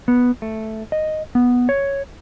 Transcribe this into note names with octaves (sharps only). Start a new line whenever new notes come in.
B3
A3
D#5
B3
C#5